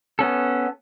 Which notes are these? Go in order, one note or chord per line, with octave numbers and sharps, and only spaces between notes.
B3 C#4 A4